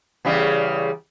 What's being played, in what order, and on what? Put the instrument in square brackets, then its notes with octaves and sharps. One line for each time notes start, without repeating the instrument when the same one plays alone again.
[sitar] E2 C#3 G3